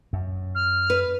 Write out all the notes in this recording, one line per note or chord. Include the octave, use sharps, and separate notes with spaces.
F#2
F6
B4